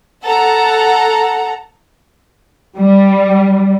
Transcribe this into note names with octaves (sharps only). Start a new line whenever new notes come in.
A4 F#5 A#5
G3